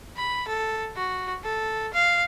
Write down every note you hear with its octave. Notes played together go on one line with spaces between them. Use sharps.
B5
A4
F#4
A4
F5